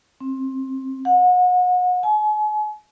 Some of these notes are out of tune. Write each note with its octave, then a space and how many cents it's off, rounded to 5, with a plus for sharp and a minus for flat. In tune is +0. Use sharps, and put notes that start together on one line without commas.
C4 +20
F#5 -35
G#5 +40